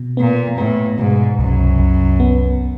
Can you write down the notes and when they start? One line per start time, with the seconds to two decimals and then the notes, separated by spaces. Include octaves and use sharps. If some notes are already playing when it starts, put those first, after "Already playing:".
Already playing: B2
0.17 A#2 B3
0.58 A2 B3
0.98 G#2 B2
1.38 C2 F#2
1.79 C2
2.20 B3